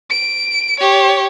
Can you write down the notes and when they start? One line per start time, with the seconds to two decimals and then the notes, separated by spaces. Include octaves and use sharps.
0.10 D7
0.80 G4 C#5